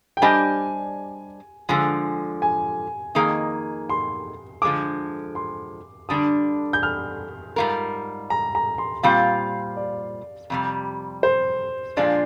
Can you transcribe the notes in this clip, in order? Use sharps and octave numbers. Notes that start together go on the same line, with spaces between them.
G5
G3 D4 G4 C5 D#5 G#5
D3 F3 G#3 G#5
G#5
F2 D#3 A#3 D#4 G#4
C6
D3 F3 G#3 D6
C6
D3 G3 D4 D#6
G6
F6
G#2 G3 A#3 F4 A#4
A#5
A#5
C6
A#2 G3 C4 F4 F5
D5
F2 C3 G3
C5
A#2 F3 G#3 D4 F4 D5